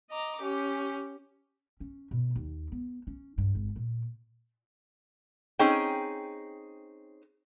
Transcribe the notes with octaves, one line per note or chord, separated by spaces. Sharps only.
D#5 A#5 D6
C#4 G4
C#4
B2
D#2
B3
C#4
G2
G#1
A#2
C4 C#4 D#4 G#4 G5